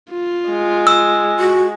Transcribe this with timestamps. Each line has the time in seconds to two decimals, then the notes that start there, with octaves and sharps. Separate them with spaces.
0.10 F4
0.49 G#3
0.87 E6
1.40 F#4